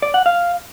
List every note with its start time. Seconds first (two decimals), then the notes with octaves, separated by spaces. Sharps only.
0.02 D5
0.14 F#5
0.26 F5